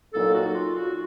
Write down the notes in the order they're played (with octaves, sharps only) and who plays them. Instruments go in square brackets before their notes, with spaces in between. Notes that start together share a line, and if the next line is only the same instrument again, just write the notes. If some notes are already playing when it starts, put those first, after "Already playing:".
[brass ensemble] C2 A#2 F#3 A#3 D#4 [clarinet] A4
[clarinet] F#4
F4
F#4